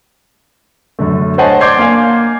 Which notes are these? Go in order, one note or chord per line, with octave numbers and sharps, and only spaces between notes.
F#2 D3 A3
C5 C#5 D#5 F#5 G#5 A5
D5 C6 D6 G6 G#6 C7
A#3 F5 G#5